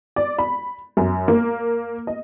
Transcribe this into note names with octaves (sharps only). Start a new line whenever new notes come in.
D5
B5
F#2
A#3
D#5